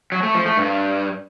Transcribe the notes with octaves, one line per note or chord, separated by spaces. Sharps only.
F#3
A3
F3
A3
G2